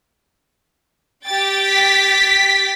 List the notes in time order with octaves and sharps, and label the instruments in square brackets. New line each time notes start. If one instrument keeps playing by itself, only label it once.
[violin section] G4 G5 A6
[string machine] B6